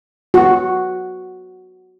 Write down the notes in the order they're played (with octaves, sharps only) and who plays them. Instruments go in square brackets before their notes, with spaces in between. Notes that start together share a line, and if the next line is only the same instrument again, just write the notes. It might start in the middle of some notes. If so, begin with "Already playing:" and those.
[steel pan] F#4